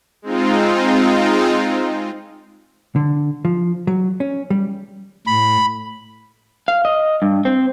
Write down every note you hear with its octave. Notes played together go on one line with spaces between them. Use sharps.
G#3 C4 D#4 F4
D3
F3
F#3
C#4
G3
A2 B5
F5
D#5
G2
C4